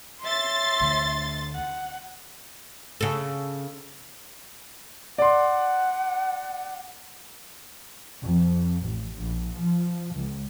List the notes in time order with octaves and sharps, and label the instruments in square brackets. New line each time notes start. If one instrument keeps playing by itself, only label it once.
[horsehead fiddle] C#5 E5 [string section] C6 A6
[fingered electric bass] D2 D3 A3
[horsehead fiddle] F#5
[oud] C#3 A4
[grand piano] D5 C6 [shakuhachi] F#5
[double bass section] F2
A1
A#1
F3
C#2